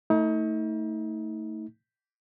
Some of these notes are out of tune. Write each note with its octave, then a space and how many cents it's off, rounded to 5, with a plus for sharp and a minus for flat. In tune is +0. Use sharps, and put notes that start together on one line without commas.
A3 +20 D#4 +40